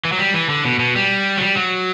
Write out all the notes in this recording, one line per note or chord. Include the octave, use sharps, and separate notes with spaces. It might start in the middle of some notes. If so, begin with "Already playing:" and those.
E3
F#3
G3
E3
D3
B2
B2
G3
F#3
G3
F#3